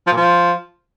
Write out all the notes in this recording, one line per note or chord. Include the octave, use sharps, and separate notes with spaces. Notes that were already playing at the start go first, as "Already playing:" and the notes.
F3
A#2
F3